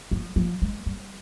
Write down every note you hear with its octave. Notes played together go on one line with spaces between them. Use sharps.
F3
F3
G#3
G3